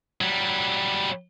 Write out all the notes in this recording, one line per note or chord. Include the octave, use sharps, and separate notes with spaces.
F#3 G3